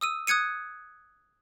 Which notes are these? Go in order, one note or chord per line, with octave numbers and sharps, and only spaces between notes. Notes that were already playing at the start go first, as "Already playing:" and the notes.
D#6 E6 D#7
D#6 F#6 G#6 C#7 D#7